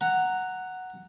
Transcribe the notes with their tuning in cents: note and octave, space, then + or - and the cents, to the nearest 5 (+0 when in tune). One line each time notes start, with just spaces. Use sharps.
F#5 +0 A#5 -10